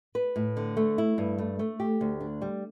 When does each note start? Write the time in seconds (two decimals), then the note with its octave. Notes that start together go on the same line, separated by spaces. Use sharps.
0.15 B4
0.36 A2
0.57 D3
0.77 A3
0.98 E4
1.18 G2
1.38 A3
1.59 A3
1.80 G4
2.01 D2
2.21 D4
2.42 G3